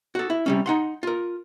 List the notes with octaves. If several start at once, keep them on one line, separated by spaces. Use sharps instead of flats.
F#4 A4
E4
C3 G3 C#4
D#4 F#5 C6
F4 A#4